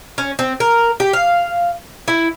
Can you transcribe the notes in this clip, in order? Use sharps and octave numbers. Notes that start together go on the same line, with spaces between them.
C#4
C4
A#4
G4
F5
E4